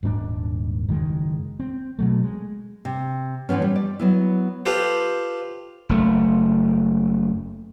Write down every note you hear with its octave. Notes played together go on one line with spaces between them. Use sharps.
D#1 G#2 C#4 D4
F#1 D#3 G#3
C4
B2 F#3 A3
G#3
C3
A2 E3 F3 B3 C#4
G3
D5
F#3 B3 E4
F4 G4 A4 B4 C5
F#1 A3